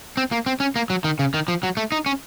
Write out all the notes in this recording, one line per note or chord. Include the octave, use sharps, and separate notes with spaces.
C4
A#3
C4
C#4
A#3
F#3
D#3
C#3
D#3
F3
F#3
A3
D#4
C#4